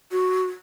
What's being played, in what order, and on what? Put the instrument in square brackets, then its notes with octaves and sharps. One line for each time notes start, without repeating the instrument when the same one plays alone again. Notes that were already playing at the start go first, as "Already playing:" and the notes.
[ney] F#4